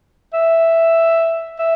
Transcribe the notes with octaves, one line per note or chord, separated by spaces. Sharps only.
E5
E5